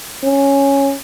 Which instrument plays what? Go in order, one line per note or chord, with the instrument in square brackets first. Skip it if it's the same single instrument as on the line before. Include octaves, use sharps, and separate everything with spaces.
[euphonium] C#4